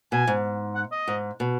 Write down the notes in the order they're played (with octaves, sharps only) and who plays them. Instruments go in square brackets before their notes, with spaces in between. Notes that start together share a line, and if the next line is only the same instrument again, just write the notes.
[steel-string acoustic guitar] B2 [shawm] G#5
[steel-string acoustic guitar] G#2
[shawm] F#5
D#5
[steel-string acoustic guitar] G#2
B2